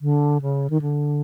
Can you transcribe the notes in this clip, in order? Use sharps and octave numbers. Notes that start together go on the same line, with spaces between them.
D3
C#3
D#3
D3